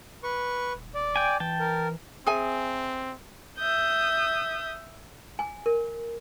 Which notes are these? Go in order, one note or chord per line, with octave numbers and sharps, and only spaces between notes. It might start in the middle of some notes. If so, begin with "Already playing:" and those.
B4 C#6
D#1
D5
G5 G#5
E3 G5 A5
A#4
C4 G#4 E5 G#5
E5 D#6 G6
G#5
A#4